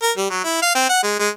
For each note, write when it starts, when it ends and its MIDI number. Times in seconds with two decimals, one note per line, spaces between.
0.02 0.11 70
0.17 0.26 55
0.30 0.40 54
0.44 0.62 64
0.62 0.72 77
0.75 0.87 60
0.89 1.02 78
1.03 1.19 56
1.19 1.29 56